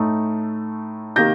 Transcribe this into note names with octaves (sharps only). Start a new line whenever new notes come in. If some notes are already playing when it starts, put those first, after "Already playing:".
Already playing: A2 A3 D#4
C3 D#3 A#3 G6 A#6